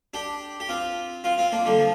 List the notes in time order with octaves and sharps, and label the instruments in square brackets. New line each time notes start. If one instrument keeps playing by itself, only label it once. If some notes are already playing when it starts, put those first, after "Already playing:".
[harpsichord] D4 G4
G4
C4 F4
C4 F4
C4 F4
A#3 D4
D3 G3
F3